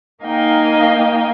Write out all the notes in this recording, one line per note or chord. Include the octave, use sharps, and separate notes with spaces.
A#3 D#4 D#5 F5 G5 G#5